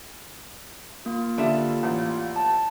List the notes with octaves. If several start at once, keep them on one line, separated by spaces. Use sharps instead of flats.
A#3 F4
D3 G3 E5 E7
A1
A5